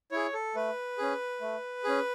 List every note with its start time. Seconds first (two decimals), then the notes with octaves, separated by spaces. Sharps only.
0.11 E4 G#4 C#5
0.33 A4
0.55 A3 B4
0.98 C#4 G#4
1.41 A3
1.84 C#4 G#4